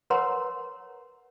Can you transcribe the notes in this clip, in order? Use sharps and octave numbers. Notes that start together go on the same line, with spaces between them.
A#4 B4 C#5 F#5 A#5 C6